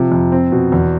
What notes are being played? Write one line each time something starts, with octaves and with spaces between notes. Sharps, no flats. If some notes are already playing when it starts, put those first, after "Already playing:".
Already playing: C3 F3
F2
C4
B2
E2